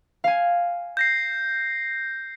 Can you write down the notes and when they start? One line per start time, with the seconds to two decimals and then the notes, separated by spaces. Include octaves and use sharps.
0.24 F5 G#5
0.97 G6 A#6 C7